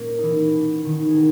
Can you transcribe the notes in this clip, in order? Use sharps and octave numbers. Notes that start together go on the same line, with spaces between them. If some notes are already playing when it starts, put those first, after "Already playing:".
Already playing: A#2 A#3 C#4 A#4 C#5
B2 E3 D#4 E4
B2
B2 D#3 D#4
G#4
B2 A#4